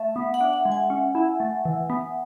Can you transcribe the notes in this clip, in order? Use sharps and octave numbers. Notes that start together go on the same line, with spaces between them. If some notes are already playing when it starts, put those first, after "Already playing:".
Already playing: A3 E5
B3
F#5
D4
F#5
G#3
G#5
C#4
E4
A3
E3
B3